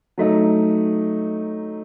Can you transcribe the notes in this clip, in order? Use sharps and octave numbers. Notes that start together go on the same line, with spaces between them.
F#3 A3 D#4